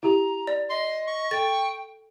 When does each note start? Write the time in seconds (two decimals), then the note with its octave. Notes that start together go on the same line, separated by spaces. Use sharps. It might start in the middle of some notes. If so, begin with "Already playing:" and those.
0.03 E4 G4 A#5
0.47 D5
0.70 D#5 C6
1.07 C#6
1.31 A4 G5 A6